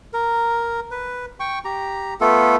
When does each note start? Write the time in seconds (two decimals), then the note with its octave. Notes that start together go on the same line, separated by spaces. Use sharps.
0.13 A#4
0.91 B4
1.40 G5 C#6
1.65 G4 A#5
2.21 A3 B3 F4 A4